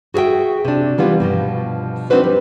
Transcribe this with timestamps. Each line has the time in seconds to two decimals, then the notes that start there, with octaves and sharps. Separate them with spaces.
0.14 F#4 G#4 B4 E5 G5
0.65 C3 D4
0.98 E3 G3 B3 F4
1.20 G2 B2 F3
2.10 C4 D4 D#4 F#4 B4 C5
2.24 G3